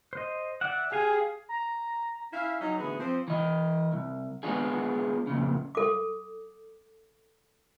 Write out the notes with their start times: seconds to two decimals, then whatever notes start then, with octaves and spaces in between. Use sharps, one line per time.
0.13 C5 D#5
0.61 D5 E5 F#5
0.92 G4 G#4 F5 G#5
1.49 A#5
2.33 C#4 E4 E5 F5
2.60 F#3 C#4 D#4
2.78 A2 D3 E3 B3 F#4 G#4
3.00 F3 C4
3.28 E3 D#5
3.92 C2
4.43 G#3 B3 D4 F4 G#4
5.27 F2 A#2 C#3
5.75 A4 D6